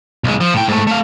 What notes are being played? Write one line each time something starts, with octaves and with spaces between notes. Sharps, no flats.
B1 G#3
F3
A2 G5
G#2 A3
A3 F5